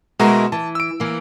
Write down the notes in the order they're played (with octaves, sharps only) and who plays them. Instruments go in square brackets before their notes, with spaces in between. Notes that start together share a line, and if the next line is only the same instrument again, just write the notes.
[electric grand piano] B2 F#4 A#5 [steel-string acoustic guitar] G#3 E4 A#4
[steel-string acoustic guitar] E3 [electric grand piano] A5
[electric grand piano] E6 D7
[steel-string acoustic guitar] E3 A#3